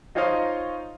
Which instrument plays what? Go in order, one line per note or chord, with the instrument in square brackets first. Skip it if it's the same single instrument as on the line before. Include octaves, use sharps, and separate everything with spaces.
[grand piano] D#4 F4 C5 C#5 D#5 F5